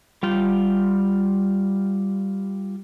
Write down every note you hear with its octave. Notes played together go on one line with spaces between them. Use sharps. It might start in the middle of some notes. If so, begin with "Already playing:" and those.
G3 F4 G5